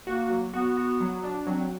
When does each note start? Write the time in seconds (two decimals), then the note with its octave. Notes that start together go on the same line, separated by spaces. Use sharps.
0.07 A#3 F#4
0.30 F#3
0.53 B3 F#4
0.77 F#4
1.00 F#3
1.24 D4
1.47 F#3 C4